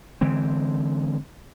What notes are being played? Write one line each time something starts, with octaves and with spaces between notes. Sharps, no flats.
D3 E3 G#3 C4